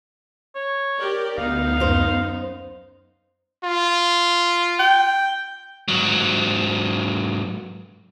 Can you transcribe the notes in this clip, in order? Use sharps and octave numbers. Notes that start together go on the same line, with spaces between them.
C#5
G4 A#4 D5
D2 B3 D#4 F5
F#2 C5
F4
G5
G#2 F#3